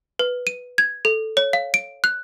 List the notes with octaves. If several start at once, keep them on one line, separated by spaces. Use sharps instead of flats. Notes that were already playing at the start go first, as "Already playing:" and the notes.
B4
D#7
G#6
A4
C#5
F5
D7
F#6